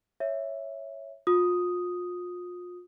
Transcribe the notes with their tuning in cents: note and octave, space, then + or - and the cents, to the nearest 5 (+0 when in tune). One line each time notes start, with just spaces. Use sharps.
C#5 +0 E5 +0
F4 +35 D#6 +0